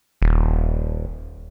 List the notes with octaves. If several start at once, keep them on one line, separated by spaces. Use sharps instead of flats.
D#1